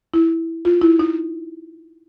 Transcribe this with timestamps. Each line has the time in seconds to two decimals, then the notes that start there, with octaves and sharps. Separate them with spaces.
0.14 E4
0.65 F4
0.81 E4
0.99 D#4